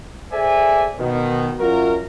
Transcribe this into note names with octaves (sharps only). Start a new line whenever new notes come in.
G#4 A4 C5 D5 E5 G#5
B2 D#3
F#2 F#3 F4 F#4 A#4